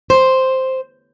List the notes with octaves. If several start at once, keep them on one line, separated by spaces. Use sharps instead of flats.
C5